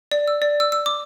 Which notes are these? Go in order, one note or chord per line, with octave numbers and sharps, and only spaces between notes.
D5
E6
D5
E6
E6
D6